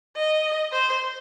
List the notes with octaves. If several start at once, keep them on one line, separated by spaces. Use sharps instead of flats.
D#5
C5